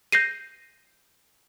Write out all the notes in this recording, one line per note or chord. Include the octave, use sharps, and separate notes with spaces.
G6 A#6 C7 D#7